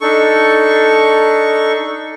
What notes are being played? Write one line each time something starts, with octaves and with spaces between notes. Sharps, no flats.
D4 D#4 A4 C#6